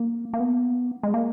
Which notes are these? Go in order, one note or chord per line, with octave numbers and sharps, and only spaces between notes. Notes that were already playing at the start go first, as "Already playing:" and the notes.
Already playing: A#3
A#3
B3
G#3
A#3